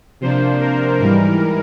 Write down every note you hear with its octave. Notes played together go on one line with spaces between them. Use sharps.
C3 F3 A#3 D4 C5
A#4
G#2 E3 G3 A#4